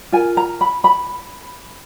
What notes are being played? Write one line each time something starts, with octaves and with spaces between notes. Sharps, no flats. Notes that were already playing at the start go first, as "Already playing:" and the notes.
F4 A#4 G#5
A#5
B5
B5